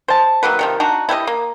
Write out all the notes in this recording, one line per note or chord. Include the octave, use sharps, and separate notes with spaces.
C5 A5
D#3 F#3 A#3 B4
C3 D#3 F3
D4 D#4 F#4
E4 G4 B4 D#5
A#3